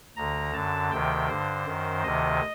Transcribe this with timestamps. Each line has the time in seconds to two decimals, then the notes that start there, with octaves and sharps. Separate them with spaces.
0.17 D2 D3 A#5
0.54 F#2 D3 A5
0.91 D2 C3 D#3 G5
1.28 G2 D3 C5
1.66 F#2 D#3
2.03 D2 C3 D#3 D#5